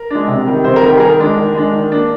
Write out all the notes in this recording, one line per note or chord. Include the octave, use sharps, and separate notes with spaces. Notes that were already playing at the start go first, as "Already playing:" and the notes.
Already playing: A#4
G#3 D4
C3
D#3 G3
C3 C5
A#4
D#3 G3
G4
G#4
D#3 A#4
G#3 D4
D#3
G#3 D4
D#3
A#3 D4